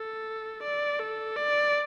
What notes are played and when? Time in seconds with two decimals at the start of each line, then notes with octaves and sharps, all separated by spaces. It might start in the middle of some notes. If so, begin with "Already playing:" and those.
Already playing: A4
0.63 D5
1.00 A4
1.36 D5